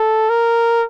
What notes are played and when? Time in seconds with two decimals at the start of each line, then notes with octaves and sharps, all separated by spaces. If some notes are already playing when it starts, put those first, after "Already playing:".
Already playing: A4
0.29 A#4